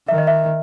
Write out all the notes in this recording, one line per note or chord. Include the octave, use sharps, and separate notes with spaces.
D#3 E5
D#5
E5